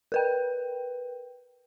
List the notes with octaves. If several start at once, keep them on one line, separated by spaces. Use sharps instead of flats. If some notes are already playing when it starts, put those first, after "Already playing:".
A#4 B4 G5